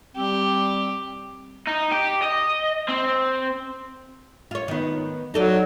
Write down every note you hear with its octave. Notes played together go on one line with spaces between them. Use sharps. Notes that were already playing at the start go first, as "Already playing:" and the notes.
G3 C4 G4
D#4
G4
D#5
C4
F4 C#5
D#3 B3
F#3 D#4 A4 D5